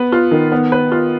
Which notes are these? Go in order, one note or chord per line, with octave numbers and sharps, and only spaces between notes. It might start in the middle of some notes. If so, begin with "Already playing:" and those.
Already playing: B3 B4
F4
D#3
B3
B4
F4